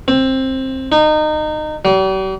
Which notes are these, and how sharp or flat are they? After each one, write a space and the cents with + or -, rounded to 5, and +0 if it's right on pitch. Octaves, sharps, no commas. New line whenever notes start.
C4 +15
D#4 -25
G3 -45